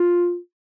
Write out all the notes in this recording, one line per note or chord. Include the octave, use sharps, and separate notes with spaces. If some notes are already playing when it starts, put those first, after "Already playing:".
Already playing: F4